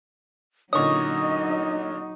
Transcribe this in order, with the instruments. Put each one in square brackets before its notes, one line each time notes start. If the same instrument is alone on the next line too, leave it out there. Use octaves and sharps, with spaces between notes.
[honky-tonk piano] A#2 D3 C#4 [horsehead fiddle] F#3 D#4 [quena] D#5 [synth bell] C#6 D#6